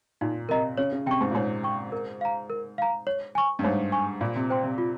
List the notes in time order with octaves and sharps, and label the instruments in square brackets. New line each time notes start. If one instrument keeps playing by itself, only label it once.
[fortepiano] A#2 [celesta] D#4
[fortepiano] C3 [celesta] A#4 D#5 A#5
[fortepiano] C#3 [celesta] C#5
[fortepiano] C#3
[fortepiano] C3 [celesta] G5 C#6
[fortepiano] G#2
A#2
[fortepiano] G#2 [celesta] C#5
[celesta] G5 C#6
A#4
F5 A#5
A#4
F5 A#5
C#5
G#5 C#6
[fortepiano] G2
[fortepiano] G#2 [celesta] C#5
[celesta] G#5 C#6
[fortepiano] A#2 [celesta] F4
[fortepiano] C3
[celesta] C5 G5 C6
[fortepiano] C3
[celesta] F4